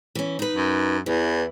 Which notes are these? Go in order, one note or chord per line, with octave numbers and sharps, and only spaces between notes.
E3 C#4
D#4 B4
F#2
E2 E3